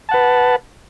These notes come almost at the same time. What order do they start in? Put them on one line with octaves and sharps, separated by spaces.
A5 F#5 B4